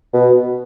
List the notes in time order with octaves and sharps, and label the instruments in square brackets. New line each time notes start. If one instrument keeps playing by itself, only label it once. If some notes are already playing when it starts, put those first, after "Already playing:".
[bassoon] B2